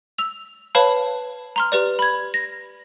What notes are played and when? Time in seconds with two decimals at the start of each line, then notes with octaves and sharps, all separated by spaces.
0.18 E6 F7
0.75 B4 C#5 F5 A5 B5
1.56 A#5 C6 F6
1.72 G4 B4 D5
1.99 B5 G#6
2.34 A#6